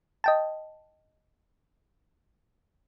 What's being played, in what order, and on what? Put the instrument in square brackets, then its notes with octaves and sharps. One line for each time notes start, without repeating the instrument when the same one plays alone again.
[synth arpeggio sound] D#5 G5 A5